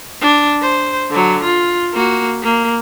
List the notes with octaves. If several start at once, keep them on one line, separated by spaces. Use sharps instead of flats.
D4
C5
D3 F#3
F4
A#3 F#4
A#3